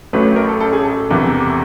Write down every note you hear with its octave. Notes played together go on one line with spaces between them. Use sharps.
A1 A2 F#3 A3 B4
A#4
A4
A4
G#4
A4
E1 E2 C3 E3